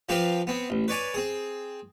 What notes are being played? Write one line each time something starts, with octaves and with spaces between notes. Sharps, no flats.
F3 C4 G4 B4 F5
B3 C4
A1
B4 C#5 D5 G#5
C4 G#4